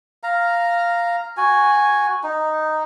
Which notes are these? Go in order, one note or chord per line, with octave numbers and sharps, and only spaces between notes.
F5 A#5
F#4 G#5
D#4